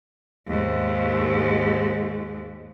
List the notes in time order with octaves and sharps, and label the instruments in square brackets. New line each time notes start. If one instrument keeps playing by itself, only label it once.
[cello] D#2 G#2